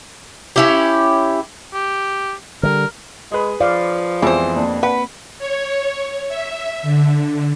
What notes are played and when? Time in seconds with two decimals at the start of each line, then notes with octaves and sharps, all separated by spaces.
0.56 C#4 E4 G4
1.74 G4
2.63 D3 G3 A#4
3.32 G#3 G#4 B4
3.61 F3 D5 F5
4.22 F2 E3 G#3 B3 C5
4.56 A#3 C4 D4
4.83 B4 F#5
5.39 C#5
6.28 E5
6.82 D3